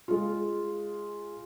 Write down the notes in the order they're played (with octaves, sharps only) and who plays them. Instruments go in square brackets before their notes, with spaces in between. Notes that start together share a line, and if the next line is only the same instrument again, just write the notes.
[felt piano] G#3 F4